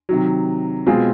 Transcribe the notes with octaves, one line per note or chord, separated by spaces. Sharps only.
C3 D#3 F#3
B2 G#3 C4 F4 G#4